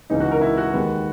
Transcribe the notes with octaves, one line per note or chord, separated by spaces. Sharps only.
C#2 C#3 E3 G#3 D#4
F#4
A#4
E4
F#4
D#2 D#3 G#3 B3